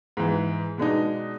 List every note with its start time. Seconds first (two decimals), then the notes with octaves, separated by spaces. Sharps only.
0.17 G#2 E3
0.78 B2 G#3 D4 D#4